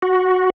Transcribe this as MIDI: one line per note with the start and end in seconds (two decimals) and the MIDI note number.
0.02 0.50 66